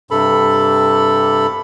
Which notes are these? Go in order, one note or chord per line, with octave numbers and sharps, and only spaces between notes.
G2 C3 A4 B5